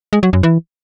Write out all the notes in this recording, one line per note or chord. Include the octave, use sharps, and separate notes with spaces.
G#3
F#3
F#2
E3